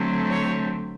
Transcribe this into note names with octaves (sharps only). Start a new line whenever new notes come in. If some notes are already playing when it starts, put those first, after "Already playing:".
Already playing: D3 F#3 A3 C4
C#5